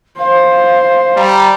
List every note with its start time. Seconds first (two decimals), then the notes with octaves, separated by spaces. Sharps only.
0.18 C5 F5
1.16 G3 A#5